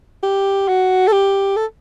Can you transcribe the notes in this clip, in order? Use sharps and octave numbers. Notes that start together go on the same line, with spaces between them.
G4
F#4
A4
G4
A4